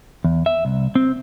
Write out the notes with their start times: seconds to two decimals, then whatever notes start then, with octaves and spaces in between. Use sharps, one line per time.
0.24 E2
0.46 E5
0.65 C2
0.95 C4